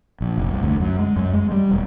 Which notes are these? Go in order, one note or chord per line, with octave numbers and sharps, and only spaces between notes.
A#1
F1
C2
D2
F#2
G#3
F#2
G#3
G3
E1